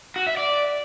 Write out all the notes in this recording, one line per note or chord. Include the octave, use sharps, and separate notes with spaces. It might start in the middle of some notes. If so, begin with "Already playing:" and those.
F#4
E5
D5